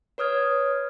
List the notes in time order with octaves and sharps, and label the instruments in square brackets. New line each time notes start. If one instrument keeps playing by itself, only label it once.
[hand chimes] B4 C#5 D#6 F6 G#6